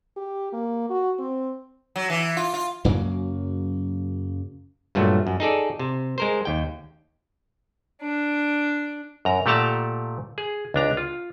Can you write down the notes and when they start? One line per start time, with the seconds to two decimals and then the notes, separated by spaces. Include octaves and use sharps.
0.17 G4
0.53 A#3
0.90 F#4
1.19 C4
1.96 F#3
2.10 E3
2.37 F4
2.54 F4
2.85 F#2 C#3 F#3 A#3
4.95 G2 A#2 F#3 A3
5.27 F#2
5.40 D#4 G#4 A4 D5
5.79 C3
6.18 G#3 A#4 C5
6.45 D#2 G5
8.00 D4
9.25 F#2 A#5
9.46 A#2 A3 G4 F#5 A5 A#5
10.38 G#4
10.74 C#2 D4 A#5
10.97 F4